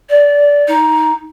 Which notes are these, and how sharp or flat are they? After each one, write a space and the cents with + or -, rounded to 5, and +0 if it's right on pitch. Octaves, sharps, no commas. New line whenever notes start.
D5 -20
D#4 +10